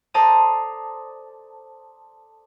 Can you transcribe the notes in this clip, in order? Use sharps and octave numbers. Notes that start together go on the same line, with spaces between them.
A4 C5 D5 A5 A#5 D#6